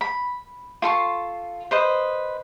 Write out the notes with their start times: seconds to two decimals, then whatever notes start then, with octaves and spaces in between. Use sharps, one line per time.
0.01 B5
0.82 F4 A4 C6 C#6
1.71 B4 C5 D#5